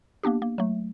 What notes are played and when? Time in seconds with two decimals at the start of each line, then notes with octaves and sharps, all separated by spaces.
0.23 A#3 B3 D4 G4
0.42 A#3
0.58 F#3 A3